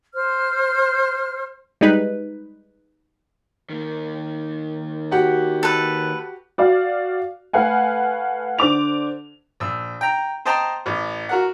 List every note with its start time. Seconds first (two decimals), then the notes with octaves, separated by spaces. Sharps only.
0.14 C5 F6
1.81 G3 G#3 D#4 B4
3.70 D#3 A#3
5.11 F#4 G4 F#5
5.63 A4 B4
6.58 F#4 D5 F5
7.53 A3 B4 F5 F#5 G#5
8.59 D3 C5 D6 F7
9.60 A#1 E6
10.01 G5 A#5
10.45 C5 D#5 G5 A5 A#5 C6
10.86 A1
11.29 F#4 A#4 F#5